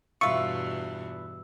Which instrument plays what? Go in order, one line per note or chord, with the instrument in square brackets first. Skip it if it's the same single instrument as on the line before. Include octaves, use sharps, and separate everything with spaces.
[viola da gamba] E2 G2 B2 [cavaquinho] F4 B4 [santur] E5 [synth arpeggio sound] C#6